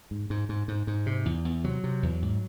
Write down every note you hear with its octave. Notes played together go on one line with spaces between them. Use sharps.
G#2
G#2
G#2
G#2
G#2
C3
E2
E2
C3 F#3
C3
E2
G#2